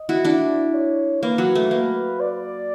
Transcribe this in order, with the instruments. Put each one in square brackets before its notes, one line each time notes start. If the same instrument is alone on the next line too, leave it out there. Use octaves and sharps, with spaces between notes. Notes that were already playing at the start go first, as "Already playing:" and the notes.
Already playing: [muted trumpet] D#5
[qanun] E4 F#4
[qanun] D4 E4 [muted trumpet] D5
[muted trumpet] C#5
[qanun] A#3 [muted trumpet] B4
[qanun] F#3
A3
[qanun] A#3 [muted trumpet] B4
[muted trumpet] D5